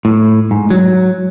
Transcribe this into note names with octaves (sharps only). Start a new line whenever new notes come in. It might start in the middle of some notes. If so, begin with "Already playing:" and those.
A2
G#2
F#3